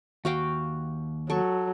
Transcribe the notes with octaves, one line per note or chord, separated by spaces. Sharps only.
D#2 F#4 F5 G5
F#3 A4 C#6